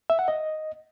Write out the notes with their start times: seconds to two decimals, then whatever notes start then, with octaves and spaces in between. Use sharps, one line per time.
0.10 E5
0.19 F#5
0.28 D#5